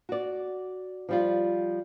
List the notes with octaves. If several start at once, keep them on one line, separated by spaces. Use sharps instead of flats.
F#4 D5
F3 G3 F4